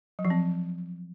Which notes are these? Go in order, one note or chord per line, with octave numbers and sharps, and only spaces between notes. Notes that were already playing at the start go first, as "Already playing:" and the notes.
F#3
F3
C4